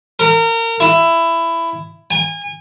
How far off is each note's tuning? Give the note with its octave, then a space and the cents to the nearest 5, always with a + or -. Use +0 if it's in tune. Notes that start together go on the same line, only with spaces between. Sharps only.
A#4 -30
E4 +15
G#5 -30